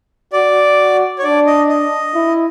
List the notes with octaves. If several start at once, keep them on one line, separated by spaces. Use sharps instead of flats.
F#4 D5
C#5
D4 D5
D#5
D#5
E4